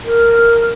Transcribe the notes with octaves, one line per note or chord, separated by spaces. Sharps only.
A#4